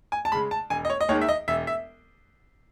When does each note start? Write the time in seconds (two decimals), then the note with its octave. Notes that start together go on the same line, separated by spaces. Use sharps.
0.12 G#5
0.25 A5
0.32 C#3 G#3 B5
0.51 A5
0.70 E1 G#5
0.85 D#5
0.90 C#5
1.01 D#5
1.09 D#2 D#3 G#3 C#5
1.22 E5
1.29 D#5
1.48 E1 E5
1.67 E5